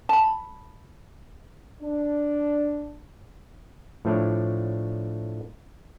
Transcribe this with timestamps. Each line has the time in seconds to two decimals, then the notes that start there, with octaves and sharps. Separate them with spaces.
0.09 A5 B5
1.82 D4
4.05 A2 F3 A3 D4 C#5 D5